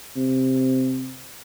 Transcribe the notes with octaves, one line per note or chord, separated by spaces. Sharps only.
C3